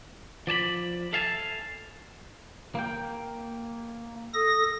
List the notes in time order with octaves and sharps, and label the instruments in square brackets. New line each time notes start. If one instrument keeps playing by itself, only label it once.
[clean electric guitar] F3 D5 A5 B5
A4 E5 F5 G#5 A5
A#3 G5
[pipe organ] A4 D#6 A#6